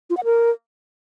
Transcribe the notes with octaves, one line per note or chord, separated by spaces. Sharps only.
F4
F#5
A#4